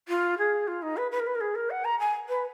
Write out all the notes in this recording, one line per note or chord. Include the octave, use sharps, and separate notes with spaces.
F4
G#4
F4
D#4
B4
B4
A#4
B4
A#4
G#4
A#4
F#5
A#5
G#5
B4